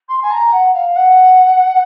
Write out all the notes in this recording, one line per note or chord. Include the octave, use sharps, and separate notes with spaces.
C6
G#5
A#5
F#5
F5
F#5